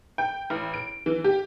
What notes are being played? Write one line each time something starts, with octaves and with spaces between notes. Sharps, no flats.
G5
A1
D7
E3
G4